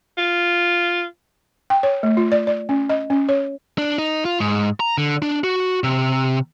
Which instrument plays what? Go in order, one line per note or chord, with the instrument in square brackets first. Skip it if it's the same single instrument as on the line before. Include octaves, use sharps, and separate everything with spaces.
[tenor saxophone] F4
[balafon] G5
C#5
A3
F4
D5
D5
C#4
D#5
C#4
C#5
[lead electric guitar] D4
D#4
F4
G#2
A#5
D3
D4
F#4
C3